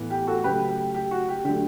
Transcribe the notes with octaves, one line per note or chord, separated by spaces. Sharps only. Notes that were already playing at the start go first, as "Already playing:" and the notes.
Already playing: A2 E3 B3
G4
F#4 A4
C#3 F#3 A3 G4 B4
G4
G4
F#4
G4
D3 F#3 A3 G4